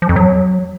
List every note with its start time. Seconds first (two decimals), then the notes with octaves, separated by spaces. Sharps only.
0.02 F3
0.09 F2
0.16 F#3